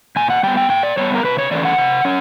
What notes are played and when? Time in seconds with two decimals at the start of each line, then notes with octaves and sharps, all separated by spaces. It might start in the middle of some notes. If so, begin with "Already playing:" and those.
0.16 A#2 G#5
0.30 F#5
0.43 G3 B3 G5
0.57 G5
0.70 A#2 G5
0.83 D5
0.97 G3 B3 C#5
1.15 A#4
1.24 C3 B4
1.38 C#5
1.51 E3 A3 C#4 D5
1.65 F#5
1.78 C3
2.05 C#4